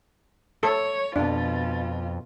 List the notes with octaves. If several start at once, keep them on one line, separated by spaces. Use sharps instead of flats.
A4 C#5
F2 B2 D4 F4